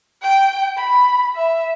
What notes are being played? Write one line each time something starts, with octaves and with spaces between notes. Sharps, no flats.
G5
B5
E5